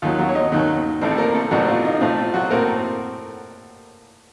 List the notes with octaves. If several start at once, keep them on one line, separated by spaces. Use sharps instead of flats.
D#2 D#3 F#3 F4
F#3 F#4
C#5
D#4 D#5
D#2 D#3 F#3
A1 A2 A3 C4 C5
A4
A#3 A#4
A3 A4
A1 A2 F#3 A3 F#4
F4
D#4
D#4
A2 A3 C4 F4
F4
F#3 F#4
A2 A3 A#3 C4 A#4